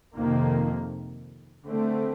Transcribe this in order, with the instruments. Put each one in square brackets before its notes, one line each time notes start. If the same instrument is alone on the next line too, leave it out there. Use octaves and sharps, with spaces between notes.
[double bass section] F2 C3 D#3 A#3
D3 A3 C4